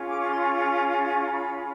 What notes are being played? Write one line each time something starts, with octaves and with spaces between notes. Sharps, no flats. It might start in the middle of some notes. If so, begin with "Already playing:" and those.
Already playing: C#4 F4 G#4
D6
C#6
C6
C#6
C#6
A#5
B5